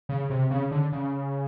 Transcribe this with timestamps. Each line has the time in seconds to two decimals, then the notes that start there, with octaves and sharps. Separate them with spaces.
0.09 C#3
0.30 C3
0.50 C#3
0.71 D3
0.92 C#3